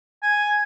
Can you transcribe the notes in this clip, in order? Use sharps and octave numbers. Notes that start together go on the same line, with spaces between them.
G#5